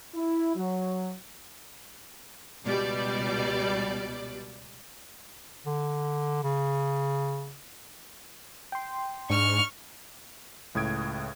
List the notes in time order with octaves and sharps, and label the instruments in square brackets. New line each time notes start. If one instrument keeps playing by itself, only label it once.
[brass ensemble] E4
F#3
[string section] C#2 B2 G3 D5
[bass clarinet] D3
C#3
[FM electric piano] G5 C6
[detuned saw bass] G#2 [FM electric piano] D4 [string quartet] C#6 F6
[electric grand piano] C#2 A2 D#6 G#6 D7